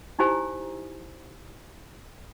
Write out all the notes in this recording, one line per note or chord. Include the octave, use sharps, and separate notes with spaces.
D#4 E4 G4 C5 G#5 A#5